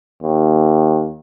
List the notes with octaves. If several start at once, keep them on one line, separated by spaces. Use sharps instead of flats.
D#2